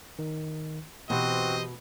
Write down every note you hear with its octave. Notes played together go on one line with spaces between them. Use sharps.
D#3
B2 E3 C4 F#4 G4 C5 D#5